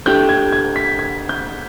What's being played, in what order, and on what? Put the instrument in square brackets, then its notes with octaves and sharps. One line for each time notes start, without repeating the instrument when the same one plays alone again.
[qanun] A3 D4 G4 [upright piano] G6
[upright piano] G#6
G#6
B6
G#6
G6